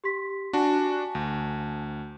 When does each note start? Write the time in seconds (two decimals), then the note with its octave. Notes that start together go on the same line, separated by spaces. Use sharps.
0.04 G4 C6 B6
0.53 D4 F#4 G#5 A5
1.15 D2